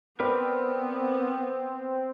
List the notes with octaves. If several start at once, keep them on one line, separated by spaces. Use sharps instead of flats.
B3 C4 A#4 B4 D5